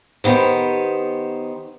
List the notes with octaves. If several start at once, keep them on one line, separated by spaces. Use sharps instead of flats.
D#3 B3 G4 C5